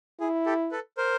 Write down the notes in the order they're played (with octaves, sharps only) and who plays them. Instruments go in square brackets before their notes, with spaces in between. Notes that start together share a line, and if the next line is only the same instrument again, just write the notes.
[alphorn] E4 [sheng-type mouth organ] G#4
[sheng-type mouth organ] G4 A4
A4 B4
A#4 C5